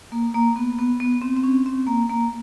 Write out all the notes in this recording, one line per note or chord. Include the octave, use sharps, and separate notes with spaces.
A#3
A#3
B3
B3
B3
C4
C4
C#4
C4
A#3
A#3